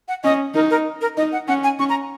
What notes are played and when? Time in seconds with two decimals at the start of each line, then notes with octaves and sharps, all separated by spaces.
0.08 F#5
0.24 C#4 D#5
0.55 D#4 A#4
0.70 A#4
1.01 A#4
1.17 D#4 D#5
1.32 F#5
1.48 C#4 F#5
1.64 G#5
1.79 C#4 C#6
1.89 A#5